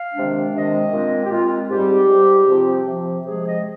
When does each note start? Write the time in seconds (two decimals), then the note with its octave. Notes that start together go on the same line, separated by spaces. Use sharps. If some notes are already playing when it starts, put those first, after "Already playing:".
Already playing: F5
0.15 C3 D#3 G#3 D4
0.53 C3 D#3 G#3 D4 D#5
0.93 A#2 G#3 C4
1.25 G4
1.31 A#2 G#3 C4 F4
1.70 G#2 G3 C4 G4
2.10 G#2 G3 C4
2.49 C3 F3 C4
2.87 C3 F3 C4
3.26 C3 F3 G#3 G#4
3.46 D#5